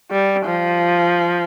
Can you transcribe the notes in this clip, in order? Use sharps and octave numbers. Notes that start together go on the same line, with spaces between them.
G3
F3